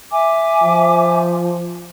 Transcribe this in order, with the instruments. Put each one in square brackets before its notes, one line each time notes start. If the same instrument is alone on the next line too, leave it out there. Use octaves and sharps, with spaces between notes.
[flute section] E5 G#5 D6
[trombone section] F3